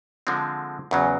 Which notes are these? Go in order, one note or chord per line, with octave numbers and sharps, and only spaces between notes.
D3 F3 G#3 C4
E2 C#3 F#3